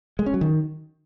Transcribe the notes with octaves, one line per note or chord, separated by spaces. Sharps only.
G#3
C#4
F#3
D#3